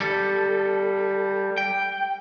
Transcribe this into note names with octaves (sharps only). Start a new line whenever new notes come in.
G3 A4
G5